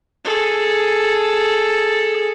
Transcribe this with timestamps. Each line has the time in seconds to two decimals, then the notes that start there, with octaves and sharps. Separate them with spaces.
0.25 G#4 A4